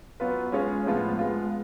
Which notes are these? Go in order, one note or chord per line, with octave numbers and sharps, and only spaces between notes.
F#3 B3 F4 B4
G#3 C#4 F4 G#4 C#5
A2 F3 G#3 B3 F4
G#3 B3 F4